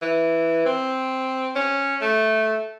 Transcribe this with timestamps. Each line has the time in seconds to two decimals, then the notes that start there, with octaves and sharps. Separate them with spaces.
0.02 E3
0.66 C4
1.55 C#4
2.02 A3